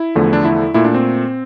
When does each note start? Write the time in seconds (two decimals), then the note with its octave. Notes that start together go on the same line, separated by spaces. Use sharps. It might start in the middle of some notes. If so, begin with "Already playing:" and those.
Already playing: E4
0.15 E2 D3 F3 A3
0.33 D4
0.45 E4
0.74 A#2 A3 E4
0.84 D4
0.94 C4